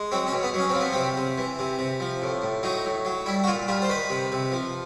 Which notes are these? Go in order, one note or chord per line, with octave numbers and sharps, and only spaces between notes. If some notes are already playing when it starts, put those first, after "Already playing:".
Already playing: G#3
F#3 C4
C#4
B2
B3
F#3 C#4
F3 C4
B3
C3 C4
C3
E3
C3
C3
F3
A2
A2
F#3 D#4
A2
F#3
G3 E4
F#4
A#2 F4
G3 F4
C5
D#3 B4
C3
C3
F3